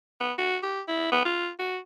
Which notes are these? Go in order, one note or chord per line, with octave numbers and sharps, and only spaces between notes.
B3
F#4
G4
E4
B3
F4
F#4